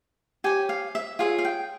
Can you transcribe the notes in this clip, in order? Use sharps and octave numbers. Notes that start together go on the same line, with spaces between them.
G4 C#5 G#5
F5
E5
F4 G#4 C#5 F5
F5
G5